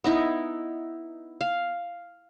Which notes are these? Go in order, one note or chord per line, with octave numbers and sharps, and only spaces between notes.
B3 D#4 E4
F5